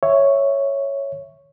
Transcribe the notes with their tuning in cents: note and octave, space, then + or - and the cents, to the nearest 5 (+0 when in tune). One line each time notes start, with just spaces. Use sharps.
C#5 +0 E5 +0